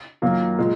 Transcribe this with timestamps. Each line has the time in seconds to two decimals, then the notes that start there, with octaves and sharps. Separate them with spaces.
0.22 F#2 D#3 F#3 A#3 F4
0.58 A#2 G#3